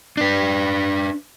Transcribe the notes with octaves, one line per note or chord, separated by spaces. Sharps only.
D4 B4